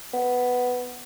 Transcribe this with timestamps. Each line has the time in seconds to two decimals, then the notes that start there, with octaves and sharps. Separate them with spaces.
0.13 B3